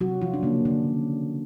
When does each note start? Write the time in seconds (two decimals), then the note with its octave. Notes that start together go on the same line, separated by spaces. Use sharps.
0.01 C3 F#3 F#4
0.21 F3 F4
0.34 D4
0.43 C#3 A#3 C#4
0.47 F3
0.65 D3 D4